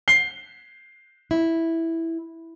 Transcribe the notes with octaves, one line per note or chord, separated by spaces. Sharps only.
C7 G7
E4